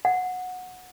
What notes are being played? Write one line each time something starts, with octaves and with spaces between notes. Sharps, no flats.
F#5